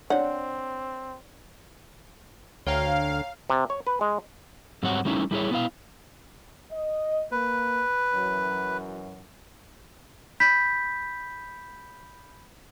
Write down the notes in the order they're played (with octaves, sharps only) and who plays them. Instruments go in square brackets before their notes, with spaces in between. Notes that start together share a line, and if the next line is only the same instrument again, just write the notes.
[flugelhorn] C4 [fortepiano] D4 [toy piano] C5 C#5 [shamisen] F#5
[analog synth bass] D2 [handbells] C#5 G5 A#5 [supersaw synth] F5
[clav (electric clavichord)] C3
C#5
B4
G#3
[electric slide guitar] G#2 F#3 G3 C4 C#5 F#5
G3 A3 C#4 D#4 E4
G3 E4 G#4 C#5
B3 E4 F5
[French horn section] D#5
[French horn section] A#3 [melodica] B4
[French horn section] F#2 E3 F#3
[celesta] B5 G6 B6